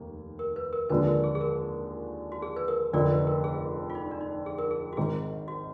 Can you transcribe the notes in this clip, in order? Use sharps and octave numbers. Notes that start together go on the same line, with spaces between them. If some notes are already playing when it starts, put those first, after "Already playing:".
Already playing: F1 D#2 A#3
A#4
B4
A#4
D#2 D3 F3 G#3 D4 B4
A#4
G#4
G#4
A#4
F#4
G#4
B4
A#4
F1 F2 D3 A#4 D5
B4
A#4
G#4
F4
D#4
D4
D#4
G#4
A#4
G#4
F#4
G#1 G#2 D#3 G#4
F#4